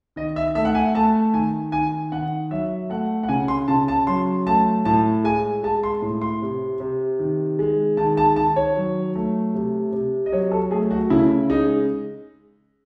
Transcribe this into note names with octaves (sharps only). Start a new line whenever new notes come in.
D#3 D#5
E5
A3 E5
F#5
G#5
A3 A5
D#3 G#5
D#3 G#5
D#3 F#5
F#3 E5
A3 F#5
F#5
C#3 G#5
C6
C#3 A5
A5
F#3 C6
A3 A5
A2 A5
G#3 G#5
G#3 A5
C6
A2
C6
C3
C3
D#3
G#3
D#3 A5
A5
D#3 A5
C#5
F#3
A3
C3
C3
D#5
F#3 C#5
A4
A3 G#4
F#4
C#3 E4
G#3 D#4